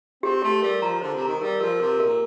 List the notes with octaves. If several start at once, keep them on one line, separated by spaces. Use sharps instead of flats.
C4 G4
A3 G4
G3 A#4
F3 A#5
D3 C5
C3
A#5
D#3
G3 A#4
F3 A#4
C3 A#4
A#2 A#4